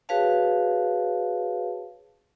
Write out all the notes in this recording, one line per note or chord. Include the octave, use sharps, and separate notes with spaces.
F#4 G#4 B4 C#5 F5 A5